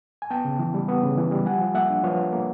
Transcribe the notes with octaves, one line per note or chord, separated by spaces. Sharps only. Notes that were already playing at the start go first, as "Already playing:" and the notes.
G#5
B3 G5 A5
C#3
E3
G3
B3
C#3
E3
G3
F3 F#5 G#5
F3
A#3 E5 F#5
D4
F3 B4 C#5
F3
A#3